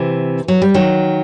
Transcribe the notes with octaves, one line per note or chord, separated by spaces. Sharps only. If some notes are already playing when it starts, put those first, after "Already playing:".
Already playing: C3 E3
F#3
G3
D#3 F#3